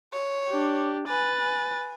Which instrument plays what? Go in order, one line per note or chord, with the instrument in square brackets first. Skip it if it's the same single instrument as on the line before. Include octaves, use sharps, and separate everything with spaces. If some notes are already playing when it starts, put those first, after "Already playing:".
[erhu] C#5
[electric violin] D4 G4
[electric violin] B4 A6 [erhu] G#5
[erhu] G#5